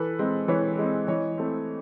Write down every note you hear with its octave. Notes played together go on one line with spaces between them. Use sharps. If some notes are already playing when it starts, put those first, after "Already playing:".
Already playing: E3 A4 B4
G#3 C4
E3 B4 C#5
G#3 C4
E3 C#5 D#5
A3 C4